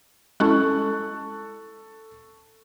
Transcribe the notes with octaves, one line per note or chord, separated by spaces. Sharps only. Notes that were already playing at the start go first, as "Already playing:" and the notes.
G#3 C#4 E4 A4 C#6 F#6